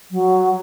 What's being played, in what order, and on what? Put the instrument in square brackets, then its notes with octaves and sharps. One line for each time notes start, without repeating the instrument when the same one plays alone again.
[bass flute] F#3